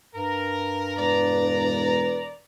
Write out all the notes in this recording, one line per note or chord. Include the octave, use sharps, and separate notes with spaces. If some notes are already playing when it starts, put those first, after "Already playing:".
G2 A#4
E1 B4 D5 A#5